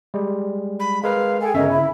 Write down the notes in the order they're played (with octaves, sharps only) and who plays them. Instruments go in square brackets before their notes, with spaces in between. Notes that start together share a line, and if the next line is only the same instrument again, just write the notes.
[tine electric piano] G3 G#3
[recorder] B5
[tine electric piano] G#3 A#4 B4 [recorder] F5
[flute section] G#4 G5 G#5 [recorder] A4
[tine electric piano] G1 C#3 E5 [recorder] C#4 [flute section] A#4 D#5
[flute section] E4 B5